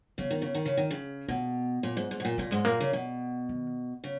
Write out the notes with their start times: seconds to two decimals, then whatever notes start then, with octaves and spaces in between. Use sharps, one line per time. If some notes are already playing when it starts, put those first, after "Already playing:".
0.18 C#3 B3
0.31 D#3
0.42 C#3
0.55 D#3
0.66 C#3
0.77 D#3
0.91 C#3
1.28 B2 A#3
1.83 A#2
1.97 G#2
2.11 G#2
2.20 B2
2.25 A#2
2.38 A#2 A#3
2.51 G#2 G#3
2.65 A#2 A#3
2.80 C#3
2.93 B2
3.49 D#3
4.04 C#3